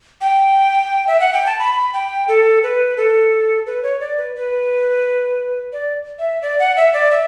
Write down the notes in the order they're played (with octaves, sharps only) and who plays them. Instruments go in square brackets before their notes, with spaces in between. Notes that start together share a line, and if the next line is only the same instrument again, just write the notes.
[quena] G5
E5
F#5
G5
A5
B5
G5
A4
B4
A4
B4
C#5
D5
B4
B4
D5
E5
D5
F#5
E5
D5
E5